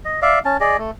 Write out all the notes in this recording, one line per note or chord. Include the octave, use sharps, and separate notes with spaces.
D#5
D5 E5 F5
C#4 A5
G#4 D5 D#5
A3